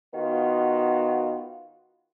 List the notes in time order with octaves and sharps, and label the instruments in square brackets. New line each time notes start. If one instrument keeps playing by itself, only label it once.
[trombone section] D#3 B3 F4 F#4